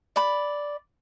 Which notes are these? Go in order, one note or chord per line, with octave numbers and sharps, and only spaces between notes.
D5 B5